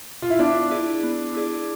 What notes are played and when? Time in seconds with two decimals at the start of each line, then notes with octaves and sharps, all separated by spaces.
0.22 F4
0.30 E4
0.39 B3 D4
0.71 E4 G#4 D5
1.03 B3
1.34 E4 G#4 D5